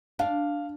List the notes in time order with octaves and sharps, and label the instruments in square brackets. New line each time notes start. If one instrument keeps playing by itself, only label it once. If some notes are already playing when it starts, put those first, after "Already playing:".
[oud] D4 [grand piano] F5